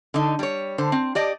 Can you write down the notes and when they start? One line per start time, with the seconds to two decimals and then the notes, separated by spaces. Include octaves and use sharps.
0.14 D3 D#4
0.39 G3 C#5
0.78 D3 C5
0.92 C4
1.15 G4 D5 D#5